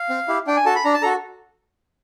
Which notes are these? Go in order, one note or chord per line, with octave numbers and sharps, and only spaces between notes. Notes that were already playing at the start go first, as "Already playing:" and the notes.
Already playing: F5
C4
E4 G4
D4 G5
G#5
F#4 A4 A5
B5
D4 A#5
A5
F#4 A4 A#5